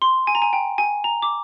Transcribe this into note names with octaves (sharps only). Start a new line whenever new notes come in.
C6
G#5
A#5
G#5
G5
G#5
A#5
D6